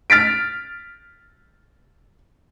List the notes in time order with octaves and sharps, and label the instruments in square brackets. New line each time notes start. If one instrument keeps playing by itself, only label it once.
[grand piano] F6 A6 B6 D7